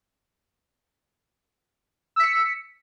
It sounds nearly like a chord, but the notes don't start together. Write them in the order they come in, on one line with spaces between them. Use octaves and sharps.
E6 B6 C#7